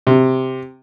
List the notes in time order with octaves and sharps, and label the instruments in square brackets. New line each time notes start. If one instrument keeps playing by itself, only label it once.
[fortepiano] C3